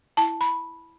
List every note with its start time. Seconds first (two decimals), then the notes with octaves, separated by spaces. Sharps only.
0.17 E4 A5
0.41 B5